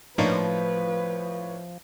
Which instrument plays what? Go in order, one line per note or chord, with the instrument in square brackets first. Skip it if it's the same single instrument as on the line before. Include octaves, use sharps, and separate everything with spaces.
[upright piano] A1 A2 C#5 [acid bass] F3 [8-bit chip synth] A#3 D4 D#4 [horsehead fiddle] B4